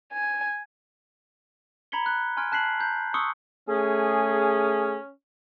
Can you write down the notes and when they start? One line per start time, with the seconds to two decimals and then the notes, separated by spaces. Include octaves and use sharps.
0.13 G#5
1.92 A#5 B5 G#6 B6 C#7 G7
2.06 F#6 G7
2.37 G#5 C6 F6 G#6 D7
2.52 A5 F#6 B6 C7 F#7
2.80 A#5 G6
3.14 C6 C#6 D#6 E6 C#7
3.69 A3 C#4 G#4